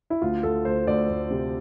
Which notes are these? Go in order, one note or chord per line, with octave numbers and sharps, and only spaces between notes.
E4
D2 F4
D2 A4
D2 C5
D2 D5
D2
C3